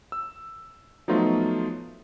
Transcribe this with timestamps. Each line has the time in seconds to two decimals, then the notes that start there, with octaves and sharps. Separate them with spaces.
0.12 E6
1.08 F3 F#3 A3 B3 D#4 F4